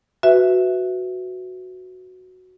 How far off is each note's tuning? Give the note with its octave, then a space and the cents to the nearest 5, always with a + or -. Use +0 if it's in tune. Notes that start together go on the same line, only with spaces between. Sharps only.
F#4 +0 B4 +0 E5 +0